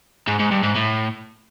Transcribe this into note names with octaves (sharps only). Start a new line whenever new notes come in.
G#2
G#2
G2
G#2
A2